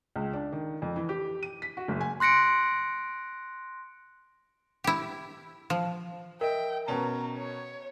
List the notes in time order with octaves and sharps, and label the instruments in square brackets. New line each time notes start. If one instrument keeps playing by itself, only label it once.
[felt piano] C#2
D4
D#3
F2
E3
G4
D#7
B6
F#4
F#1
G#5
[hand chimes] C6 F#6 A#6 C#7 D7
[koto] E4 G4
F3
[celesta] A#4 [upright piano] D#5 E5 [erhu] G5
[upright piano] B2 C#4 A5 [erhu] A#5
[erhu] C#5